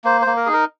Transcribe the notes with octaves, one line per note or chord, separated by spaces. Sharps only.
A#3 C5
C5
A#3
A#4
D#4 G#4
A#4